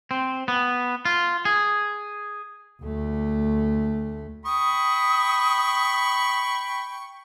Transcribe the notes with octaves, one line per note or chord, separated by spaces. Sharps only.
C4
B3
F4
G#4
D2 A3
G5 B5 C#6 D#6